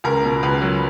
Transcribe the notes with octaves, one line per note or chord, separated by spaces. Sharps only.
C#2 A#4
B2
C#2 B4
F#3